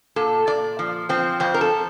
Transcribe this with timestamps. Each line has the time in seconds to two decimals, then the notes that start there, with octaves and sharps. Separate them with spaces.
0.16 A#2 A4
0.47 A#2 D5
0.79 F3
1.09 F3 C4
1.40 F2 C4
1.54 A#4
1.61 A4